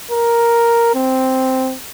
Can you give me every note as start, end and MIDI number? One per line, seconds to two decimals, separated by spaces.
0.11 0.92 70
0.95 1.75 60